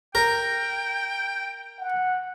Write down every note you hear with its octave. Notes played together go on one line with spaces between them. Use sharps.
A#4 G5
F#5